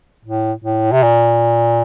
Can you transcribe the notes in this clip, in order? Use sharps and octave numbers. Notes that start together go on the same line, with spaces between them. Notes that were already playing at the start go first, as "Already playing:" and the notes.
A2
A2
C3
A#2